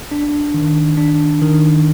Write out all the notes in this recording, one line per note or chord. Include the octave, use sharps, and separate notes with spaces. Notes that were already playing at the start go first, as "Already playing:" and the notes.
D4
D#3
D4
D#3